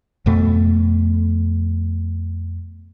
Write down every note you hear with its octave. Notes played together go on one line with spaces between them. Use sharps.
F2 B2 A3